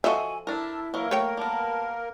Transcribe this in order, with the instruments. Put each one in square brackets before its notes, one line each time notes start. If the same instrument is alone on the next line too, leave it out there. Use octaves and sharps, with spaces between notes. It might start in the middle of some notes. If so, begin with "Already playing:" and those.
[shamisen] F3 A4 [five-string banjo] F#4 D#5 E5 [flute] G#5
[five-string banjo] D4 A#4 [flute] E4 [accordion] A5
[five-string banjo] E3 F#3 [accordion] A#3 A#4
[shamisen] A3 C#5 G5 [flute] C#6
[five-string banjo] G3 B3 [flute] A5